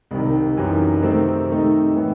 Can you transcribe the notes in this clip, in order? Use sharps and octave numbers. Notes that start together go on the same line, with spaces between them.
C2 C3 D#3
F#2 E3 G3 D#4
C3 D#3 A3 C4 D#4
C3 D#3 A3 D#4
A2 E3 B3 E4